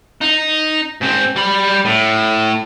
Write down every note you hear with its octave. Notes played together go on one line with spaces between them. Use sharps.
D#4
G#2 C4
G3 B5
A2